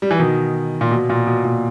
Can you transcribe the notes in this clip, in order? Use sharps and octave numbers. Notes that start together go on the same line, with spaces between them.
G3
E3
B2 D#3
A#2
B2
A#2
B2
A#2